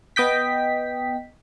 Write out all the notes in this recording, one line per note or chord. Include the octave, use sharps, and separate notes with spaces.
B3 D#5 G5 B6